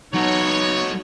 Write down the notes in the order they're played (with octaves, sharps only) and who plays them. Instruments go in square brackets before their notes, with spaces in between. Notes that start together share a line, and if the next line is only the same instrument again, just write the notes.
[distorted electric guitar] F#3 A4 [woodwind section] B3 D#4 [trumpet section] C#5